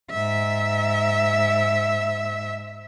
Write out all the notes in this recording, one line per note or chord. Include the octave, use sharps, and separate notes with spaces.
G#2 E5